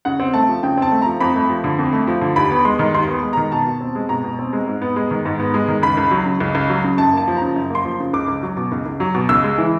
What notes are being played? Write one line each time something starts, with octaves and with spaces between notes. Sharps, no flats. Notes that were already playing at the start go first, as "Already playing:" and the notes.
C#3 F#5
C4
A3 A5
F3
C#3 G5
C4 A5
A3
F3 A#5
F2 B5
A3
F3
D3
F2
A3
F3
D3
D#2 B5
B3
G#3 C6
D#3
D#2 C6
B3
G#3
D#3 A#5
B2 A5
B2
C4
G#3
B2 A#5
B2
C4
G#3
G#2
B3
G#3
D#3
G#2
B3
G#3
D#3
C#2 B5
C#2
F#3
C#3
C#2
C#2
F#3
C#3
F#2 A5
A#3 A5
F3
C#3 A#5
F#2
A#3 C6
F3
C#3
C#2 D6
C#2
F#3
B2
C#2
C#2
F#3
B2
C#2 E6
G#3
E3